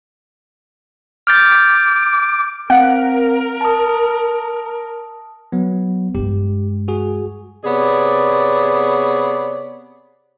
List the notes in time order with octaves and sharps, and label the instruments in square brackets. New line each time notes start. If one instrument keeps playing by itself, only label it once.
[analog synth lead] D6 [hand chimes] F6 G6 A6
[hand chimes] C4 F5 D7 [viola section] A#4 [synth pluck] F#5
[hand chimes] A5 D#6
[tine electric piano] F#3 B3
[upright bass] G2 G#3 [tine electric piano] G4
[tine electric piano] F#4 G#4
[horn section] C3 B3 G#4 C#5 D5